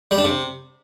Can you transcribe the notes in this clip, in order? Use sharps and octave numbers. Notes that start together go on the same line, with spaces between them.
G3
D4
C3